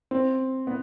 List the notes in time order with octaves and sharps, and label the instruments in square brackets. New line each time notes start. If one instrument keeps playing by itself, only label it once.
[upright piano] C4
B3